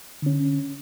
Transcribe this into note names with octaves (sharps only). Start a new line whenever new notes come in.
D3 C#4